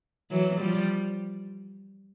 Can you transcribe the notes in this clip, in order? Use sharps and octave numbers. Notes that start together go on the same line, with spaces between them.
E3 F#3
F3 G3